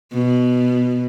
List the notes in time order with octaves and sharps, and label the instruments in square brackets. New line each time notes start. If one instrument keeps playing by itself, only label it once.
[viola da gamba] B2